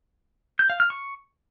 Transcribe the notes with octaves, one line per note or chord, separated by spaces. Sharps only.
G6
F5
F6
C#6